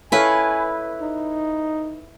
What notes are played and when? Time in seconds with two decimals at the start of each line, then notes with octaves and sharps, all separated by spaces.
0.12 E4 A4 B4 C#5 F5 G#5
1.02 D#4